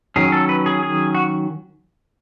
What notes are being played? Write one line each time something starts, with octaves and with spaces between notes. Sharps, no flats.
D#3 F#3 C#4 G#4
A4
B4
G#4
G#4
F#4